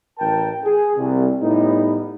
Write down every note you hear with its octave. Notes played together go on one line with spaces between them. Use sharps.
A1 A#4 G5 A5
G#4
C2
A2 G3 B3 D#4